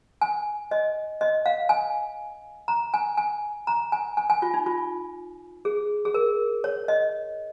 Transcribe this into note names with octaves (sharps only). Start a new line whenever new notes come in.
G#5
D#5
D#5
F5
G#5
A#5
G#5
G#5
A#5
G#5
G#5
G#5
F4
D#4
F4
G#4
G#4
A#4
C#5
D#5